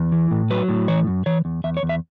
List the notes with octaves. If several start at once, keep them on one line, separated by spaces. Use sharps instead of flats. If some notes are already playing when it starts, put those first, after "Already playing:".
Already playing: E2
E3
A2
F#3 B4
A2
E3 C#5
F#2
E3 C#5
E2
E2 E5
C#5
E2
E5